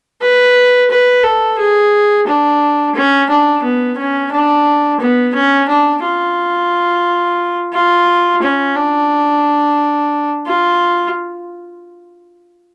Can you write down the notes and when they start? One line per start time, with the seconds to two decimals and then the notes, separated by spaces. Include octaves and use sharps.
0.22 B4
0.90 B4
1.24 A4
1.58 G#4
2.27 D4
2.95 C#4
3.29 D4
3.63 B3
3.97 C#4
4.32 D4
5.00 B3
5.35 C#4
5.68 D4
6.03 F4
7.73 F4
8.42 C#4
8.76 D4
10.47 F4